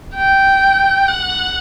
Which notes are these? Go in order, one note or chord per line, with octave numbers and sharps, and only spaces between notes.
G5
F#5